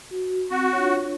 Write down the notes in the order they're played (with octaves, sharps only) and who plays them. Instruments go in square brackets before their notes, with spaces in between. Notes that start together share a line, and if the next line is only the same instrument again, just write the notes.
[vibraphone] F#4
[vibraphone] C4 [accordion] F#4
[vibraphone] D4 F4 C#5